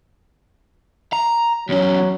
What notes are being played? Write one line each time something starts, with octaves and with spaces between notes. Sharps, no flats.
A#5
E2 F#3 C#4